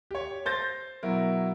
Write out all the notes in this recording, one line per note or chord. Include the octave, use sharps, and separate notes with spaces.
G4 C#5
C5 G6 A6 A#6
B2 F#3 E4 A#4